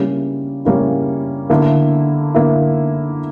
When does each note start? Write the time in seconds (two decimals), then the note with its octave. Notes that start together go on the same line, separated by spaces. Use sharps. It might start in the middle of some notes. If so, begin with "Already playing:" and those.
Already playing: C#3 G3 A#3 C#4 E4
0.65 C#3 G3 A#3 C#4 E4
1.50 D3 A#3 E4
2.34 D3 A#3 E4